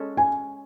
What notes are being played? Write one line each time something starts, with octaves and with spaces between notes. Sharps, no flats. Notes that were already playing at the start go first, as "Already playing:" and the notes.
Already playing: G#3 C#4 A4
G#5